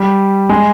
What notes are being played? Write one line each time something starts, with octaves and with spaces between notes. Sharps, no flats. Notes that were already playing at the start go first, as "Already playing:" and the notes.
Already playing: G3
G#3